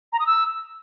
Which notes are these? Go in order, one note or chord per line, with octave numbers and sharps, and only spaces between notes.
A#5
D#6
E6